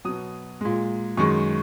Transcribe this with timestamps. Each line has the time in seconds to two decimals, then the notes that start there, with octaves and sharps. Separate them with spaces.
0.05 B2 F#3 D#6
0.61 A#2 G#3
1.17 F#2 D#3 G#3 C#6